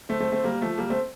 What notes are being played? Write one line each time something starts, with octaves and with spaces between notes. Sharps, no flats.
A3 C4
A3 C4
A3 C4
G3 A#3
F3 A3
G3 A#3
A3 C4